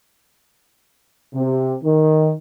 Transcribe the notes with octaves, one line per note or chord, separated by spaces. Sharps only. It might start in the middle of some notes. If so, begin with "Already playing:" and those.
C3
D#3